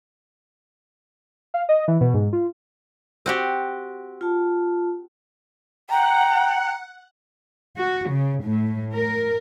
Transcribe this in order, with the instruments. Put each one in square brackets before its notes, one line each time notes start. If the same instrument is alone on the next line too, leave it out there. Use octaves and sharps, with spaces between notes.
[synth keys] F5
D#5
E3
B2
G#2
F4
[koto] C4 F#4 G4
[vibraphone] F4 A5
[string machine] F#5 [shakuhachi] G5 [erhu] A#5
[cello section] F#4
C#3
A2
A#4